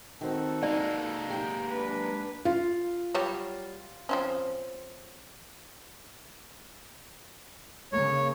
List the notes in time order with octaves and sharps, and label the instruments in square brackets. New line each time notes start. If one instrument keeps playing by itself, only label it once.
[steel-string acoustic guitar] D#3 C4 [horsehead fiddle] F#4 A4
[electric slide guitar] G#3 A#3 [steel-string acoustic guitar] D#4 D#5 [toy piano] D5
[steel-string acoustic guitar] G4 G5
[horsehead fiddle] D4 B4
[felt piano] F4
[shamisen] F#3 G3 C#5
F3 C4 C#4
[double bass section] C#3 A#3 [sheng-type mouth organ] C#5